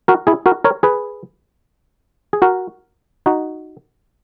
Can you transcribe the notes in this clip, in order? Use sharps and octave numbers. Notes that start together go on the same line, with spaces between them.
F#4 A#4
E4 G#4
F#4 A#4
A#4 C#5
G#4 B4
G#4
F#4 A#4
D#4 F#4